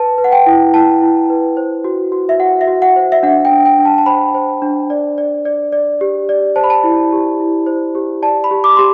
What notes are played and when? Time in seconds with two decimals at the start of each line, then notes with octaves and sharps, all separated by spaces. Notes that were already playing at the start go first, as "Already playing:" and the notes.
Already playing: B4 A5
0.18 B4
0.24 F#5
0.32 G5
0.46 E4
0.74 E4 A5
1.02 E4
1.30 B4
1.57 C5
1.84 F#4
2.12 F#4
2.29 E5
2.40 F#4 F#5
2.61 E5
2.67 F#4
2.82 F#5
2.96 C5
3.12 E5
3.23 D4 F#5
3.45 G5
3.51 D4
3.66 G5
3.78 D4
3.85 A5
3.98 A5
4.06 C5 B5
4.34 C5
4.62 D4
4.90 D5
5.18 D5
5.45 D5
5.72 D5
6.01 G4
6.29 D5
6.56 C5 A5
6.64 B5
6.70 A5
6.84 E4
7.12 G4
7.40 E4
7.67 C5
7.95 G4
8.22 D5 A5
8.44 B5
8.51 G4
8.64 D6
8.76 G4 C6